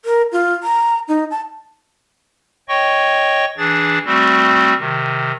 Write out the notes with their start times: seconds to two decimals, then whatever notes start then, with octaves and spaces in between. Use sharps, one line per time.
0.05 A#4
0.32 F4
0.63 A#5
1.08 D#4
1.31 A5
2.68 C#5 D#5 G5 C#6
3.58 E3 D4 G#4 A6
4.06 G3 A3 C4 F#4
4.79 C3 D#3